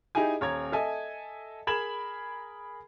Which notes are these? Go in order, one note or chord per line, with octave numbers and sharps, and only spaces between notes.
D#4 E4 G4 G#4 G#5
D#1 C#5 A#5 G#6
A4 D#5 E5 G#5
G#4 A#4 B5 G#6 E7 F#7